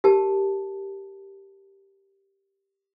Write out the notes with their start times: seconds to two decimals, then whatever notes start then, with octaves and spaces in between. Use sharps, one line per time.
0.04 G4 A#4 A5